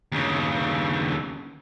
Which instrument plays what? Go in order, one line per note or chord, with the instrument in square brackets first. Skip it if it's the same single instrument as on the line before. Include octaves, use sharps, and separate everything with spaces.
[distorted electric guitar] D#2 C#3